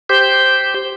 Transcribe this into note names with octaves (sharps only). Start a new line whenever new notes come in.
G4 C5 G6